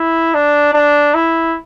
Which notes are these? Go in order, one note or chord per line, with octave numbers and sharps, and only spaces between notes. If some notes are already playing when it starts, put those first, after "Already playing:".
Already playing: E4
D4
D4
E4